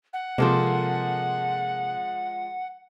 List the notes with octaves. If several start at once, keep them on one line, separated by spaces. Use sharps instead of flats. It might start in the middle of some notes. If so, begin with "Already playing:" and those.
F#5
C3 F3 G#3 A#3 A4 C5